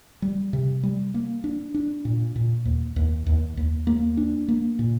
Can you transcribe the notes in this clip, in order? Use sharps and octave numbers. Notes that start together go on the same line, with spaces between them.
G3
C3
G3
A#3
D4
D4
A#2
A#2
D#2
D#2
D#2
D#2
A#3
D4
A#3
A#2